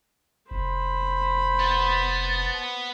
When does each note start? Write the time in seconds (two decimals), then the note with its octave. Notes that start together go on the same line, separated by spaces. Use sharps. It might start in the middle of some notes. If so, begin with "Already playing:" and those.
0.51 F1 C5 B5
1.60 B3 A5